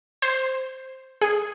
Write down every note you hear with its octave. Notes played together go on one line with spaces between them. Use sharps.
C5
G#4